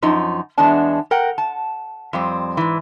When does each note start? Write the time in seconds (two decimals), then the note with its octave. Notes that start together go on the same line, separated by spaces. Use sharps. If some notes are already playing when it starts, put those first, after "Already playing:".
0.02 F#2 F3 D#4
0.58 E2 G#3 B3 D4 A5
1.11 A#4 F#5 G5
1.38 A5
2.13 F2 G3 C4
2.57 G#2 E3